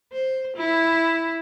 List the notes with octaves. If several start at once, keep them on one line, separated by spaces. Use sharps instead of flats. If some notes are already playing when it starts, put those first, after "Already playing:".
C5
E4